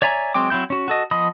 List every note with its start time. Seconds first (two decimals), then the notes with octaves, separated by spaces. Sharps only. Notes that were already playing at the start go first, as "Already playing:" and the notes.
0.02 C#5 D5 E5 G#5 A#5
0.34 F#3 G#3 C4 G5 D6
0.50 F#3 C4 E4 G6
0.70 C#4 F#4
0.88 F#4 A4 D#5
1.11 F3 B3 D#5 B5 D#6